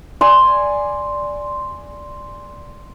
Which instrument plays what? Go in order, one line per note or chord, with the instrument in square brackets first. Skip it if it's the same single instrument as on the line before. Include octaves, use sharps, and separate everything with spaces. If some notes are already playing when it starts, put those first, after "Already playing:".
[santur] D5 G#5 C6